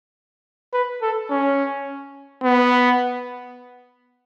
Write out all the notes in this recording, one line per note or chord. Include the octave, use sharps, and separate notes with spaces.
B4
A4
C#4
B3